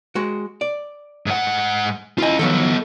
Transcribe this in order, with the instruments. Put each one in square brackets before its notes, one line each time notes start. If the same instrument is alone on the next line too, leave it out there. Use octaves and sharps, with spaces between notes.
[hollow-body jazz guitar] G#3 F#4
D5
[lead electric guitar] G#2 F#5
[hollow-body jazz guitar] E4 G#5 [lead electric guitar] F4 D#5
[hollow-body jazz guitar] D#3 F3 F#3 [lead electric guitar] B3 A4